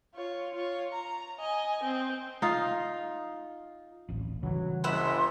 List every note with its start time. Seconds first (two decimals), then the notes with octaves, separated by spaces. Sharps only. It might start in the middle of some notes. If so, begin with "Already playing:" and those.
0.14 F4 C#5
0.55 F4 C#5
0.93 A#5
1.39 D#5 G#5
1.83 C4
2.42 D#4 F4
4.09 D1 A1
4.43 C#3 E3 F#3 G3
4.84 G1 E5 F#5 B5 C6